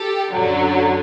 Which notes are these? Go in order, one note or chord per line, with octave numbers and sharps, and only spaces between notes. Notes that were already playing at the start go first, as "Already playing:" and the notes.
Already playing: G4 A4
F#2 D3 F#3